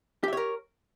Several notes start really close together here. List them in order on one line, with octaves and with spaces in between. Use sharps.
G4 E5 C#5 A#4